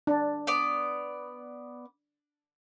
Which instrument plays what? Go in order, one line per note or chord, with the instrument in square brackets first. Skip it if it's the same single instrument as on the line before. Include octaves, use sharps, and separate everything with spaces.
[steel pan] D4
[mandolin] B3 D5